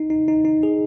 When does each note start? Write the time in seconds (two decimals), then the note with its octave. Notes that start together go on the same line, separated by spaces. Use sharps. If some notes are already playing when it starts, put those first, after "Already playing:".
Already playing: D#4
0.10 D#4
0.28 D#4
0.45 D#4
0.63 G#4